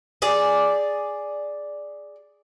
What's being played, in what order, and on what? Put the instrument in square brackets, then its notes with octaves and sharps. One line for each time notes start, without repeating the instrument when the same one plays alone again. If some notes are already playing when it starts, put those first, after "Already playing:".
[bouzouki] G#4 D5